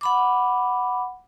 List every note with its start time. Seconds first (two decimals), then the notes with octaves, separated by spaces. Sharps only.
0.01 F#5 B5 D6